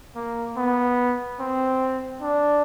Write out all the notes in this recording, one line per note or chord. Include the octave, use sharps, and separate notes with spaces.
A#3
B3
C4
D4